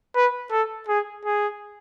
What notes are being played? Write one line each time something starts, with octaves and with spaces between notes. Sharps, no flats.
B4
A4
G#4
G#4